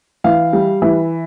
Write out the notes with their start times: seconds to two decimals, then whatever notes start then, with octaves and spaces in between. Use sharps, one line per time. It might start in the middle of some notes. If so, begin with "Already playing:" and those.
0.24 E3 F5
0.53 G3
0.82 E3